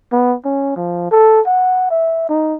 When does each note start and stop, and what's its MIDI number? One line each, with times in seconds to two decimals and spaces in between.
0.12 0.35 59
0.45 0.76 61
0.76 1.09 53
1.11 1.41 69
1.46 1.88 78
1.91 2.29 76
2.29 2.56 63